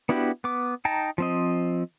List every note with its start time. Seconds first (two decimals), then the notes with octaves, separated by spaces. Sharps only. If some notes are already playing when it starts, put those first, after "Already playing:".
0.09 B3 D4 E4 F#4 G4
0.44 B3 D6
0.85 D#4 G5 A5 A#5
1.18 F3 C4 D#5